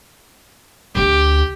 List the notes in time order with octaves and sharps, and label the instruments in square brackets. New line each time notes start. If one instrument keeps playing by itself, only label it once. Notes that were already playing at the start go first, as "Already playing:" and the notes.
[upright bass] D2 [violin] G4